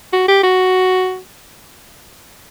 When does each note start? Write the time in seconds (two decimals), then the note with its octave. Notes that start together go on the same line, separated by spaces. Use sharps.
0.13 F#4
0.28 G4
0.43 F#4